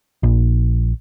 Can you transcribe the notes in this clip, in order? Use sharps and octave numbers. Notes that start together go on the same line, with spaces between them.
A#1